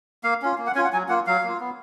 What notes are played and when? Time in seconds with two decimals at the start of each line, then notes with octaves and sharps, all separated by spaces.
0.24 A#3 F5
0.42 C#4 F4
0.58 A#3
0.67 F#5
0.75 C#4 F4 G#5
0.84 F#5
0.93 F#3 G#5
1.09 A#3 F4 F#5
1.27 F#3 F5
1.43 A#3 F4
1.60 B3